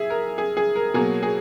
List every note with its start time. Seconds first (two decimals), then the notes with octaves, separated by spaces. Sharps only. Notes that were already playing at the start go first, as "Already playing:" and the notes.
Already playing: G#4 E5
0.10 A#4
0.38 G#4
0.57 G#4
0.76 A#4
0.94 B2 F#3 A#3 G#4
1.23 G#4